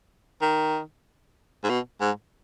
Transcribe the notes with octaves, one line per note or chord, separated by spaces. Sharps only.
D#3
G#2
B2
G#2